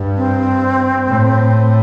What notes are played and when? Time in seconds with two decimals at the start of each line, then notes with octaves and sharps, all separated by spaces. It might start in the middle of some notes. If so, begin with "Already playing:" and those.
Already playing: G2
0.17 C4
1.07 A2